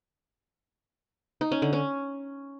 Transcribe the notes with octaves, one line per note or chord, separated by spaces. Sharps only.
D#4
C#4
D3
C#4